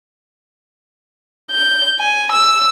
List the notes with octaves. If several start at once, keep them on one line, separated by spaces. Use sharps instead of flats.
G6
G#5
E6